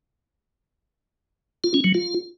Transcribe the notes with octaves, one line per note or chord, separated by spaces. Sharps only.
F4
C#4
F#3
F4